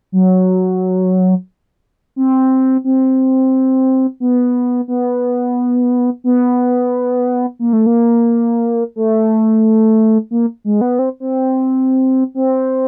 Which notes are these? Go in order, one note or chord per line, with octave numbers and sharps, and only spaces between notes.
F#3
C4
C4
B3
B3
B3
A#3
A3
A#3
A3
A#3
G#3
B3
C4
C4
C4